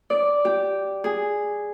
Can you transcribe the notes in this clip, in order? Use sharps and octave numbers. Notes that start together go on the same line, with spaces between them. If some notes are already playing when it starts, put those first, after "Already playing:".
D5
G4
G#4